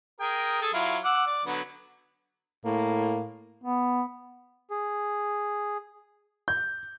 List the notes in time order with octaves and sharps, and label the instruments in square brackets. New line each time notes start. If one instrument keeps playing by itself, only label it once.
[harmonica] G#4 A#4 G5
G#4 A4
F#3 E4 F4
F#5 D6 E6
D5
D3 F#3 B3
[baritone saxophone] A2 [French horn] A#3
[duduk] B3
[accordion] G#4
[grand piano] G6